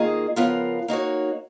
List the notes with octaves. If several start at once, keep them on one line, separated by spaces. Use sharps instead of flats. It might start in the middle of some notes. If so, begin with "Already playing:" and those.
Already playing: D#3 A#3 F4 G#4 D#5
C#3 F3 B3 F4 A#4
A#3 D#4 F#4 C#5